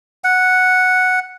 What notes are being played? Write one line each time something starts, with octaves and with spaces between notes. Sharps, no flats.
F#5